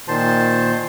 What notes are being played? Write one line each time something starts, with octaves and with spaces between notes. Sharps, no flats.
A#2 D#3 C5 A5 C6